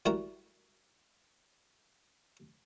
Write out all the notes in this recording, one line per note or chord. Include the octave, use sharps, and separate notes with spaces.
G3 E4 F#4 A#4